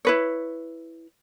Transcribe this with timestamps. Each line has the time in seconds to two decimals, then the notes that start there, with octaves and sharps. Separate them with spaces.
0.05 E4 B4 C#5